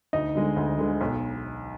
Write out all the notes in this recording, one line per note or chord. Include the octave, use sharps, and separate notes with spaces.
D2 D#4 D#5
D3 G#3
D2
D3 G#3
B1